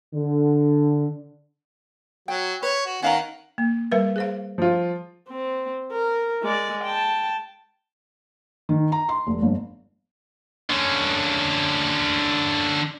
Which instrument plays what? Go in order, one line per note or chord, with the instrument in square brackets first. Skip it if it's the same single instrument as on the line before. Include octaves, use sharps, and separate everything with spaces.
[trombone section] D3
[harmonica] F#3 [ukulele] G5
[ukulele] B4 [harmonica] C#5
[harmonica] F#4
[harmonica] D#3 F#5 [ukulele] C#4 F5 A#5
[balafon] A#3
G3 A#4 B4
G#4 C5 F5
[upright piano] F3 F4
[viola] C4
A#4
G#3 D5
G5 A5
[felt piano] D#3
A#5
C6
F1
G1
[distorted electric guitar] D3 C#4